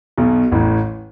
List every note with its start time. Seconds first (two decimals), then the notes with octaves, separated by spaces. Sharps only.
0.18 B1 B2
0.51 A1 A2